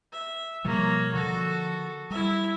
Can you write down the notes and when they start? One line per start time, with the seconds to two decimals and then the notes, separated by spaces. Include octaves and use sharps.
0.13 E5
0.64 B2 F3 G3 A#3 C#5
1.14 D3 F3 F#4 A4
2.10 G3 E4 E5